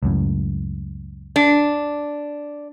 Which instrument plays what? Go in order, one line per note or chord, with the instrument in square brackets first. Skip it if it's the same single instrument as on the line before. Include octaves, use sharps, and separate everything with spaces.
[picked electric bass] C#2 F#2 A2
[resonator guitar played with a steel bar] D4